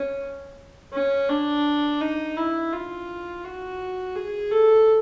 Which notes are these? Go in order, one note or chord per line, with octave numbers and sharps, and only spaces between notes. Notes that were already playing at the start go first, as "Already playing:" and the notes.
Already playing: C#4
C#4
D4
D#4
E4
F4
F#4
G#4
A4